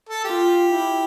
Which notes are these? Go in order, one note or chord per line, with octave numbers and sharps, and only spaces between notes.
A4
F4 G4
E4